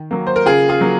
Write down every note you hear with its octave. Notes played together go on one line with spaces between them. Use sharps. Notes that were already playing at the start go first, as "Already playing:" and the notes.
Already playing: D#3
F#3 A#3
C5
A#4
C#3 F4 G#4
F4 G#4
F#3 A#3